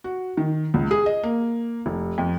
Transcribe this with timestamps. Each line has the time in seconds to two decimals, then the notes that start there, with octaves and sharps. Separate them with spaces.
0.04 F#4
0.37 D#3
0.74 C#2
0.91 G#4
1.06 D#5
1.23 A#3
1.86 F1
2.18 F2